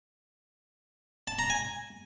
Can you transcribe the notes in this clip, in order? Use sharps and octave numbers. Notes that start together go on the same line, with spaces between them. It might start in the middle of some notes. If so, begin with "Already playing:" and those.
A5
A#5
G#5